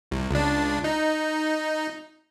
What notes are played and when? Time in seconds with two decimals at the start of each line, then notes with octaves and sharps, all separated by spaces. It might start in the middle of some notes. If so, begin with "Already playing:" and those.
0.11 C2
0.31 C#2 D4
0.84 D#4